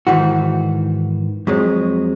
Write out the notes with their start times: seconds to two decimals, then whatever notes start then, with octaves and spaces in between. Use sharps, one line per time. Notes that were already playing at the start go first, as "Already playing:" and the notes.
0.07 G#2 D#3 E3 F#4
1.47 F2 F#3 G#3